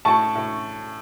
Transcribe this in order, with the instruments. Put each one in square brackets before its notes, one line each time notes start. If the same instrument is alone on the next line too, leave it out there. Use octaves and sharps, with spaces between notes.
[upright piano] A2 A5 C#6
A2